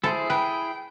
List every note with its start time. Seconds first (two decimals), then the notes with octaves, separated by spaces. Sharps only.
0.04 E4 G#4 A4 C5
0.30 B4 G5